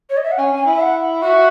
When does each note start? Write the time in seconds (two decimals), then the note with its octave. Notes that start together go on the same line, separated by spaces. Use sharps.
0.10 C#5
0.17 D#5
0.23 E5
0.31 F#5
0.38 C#4 G#5
0.53 C#4
0.66 E4
0.74 E5
0.81 F#5
1.22 F#4 E5